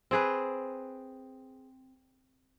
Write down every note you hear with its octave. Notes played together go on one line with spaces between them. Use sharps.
C4 G#4 B4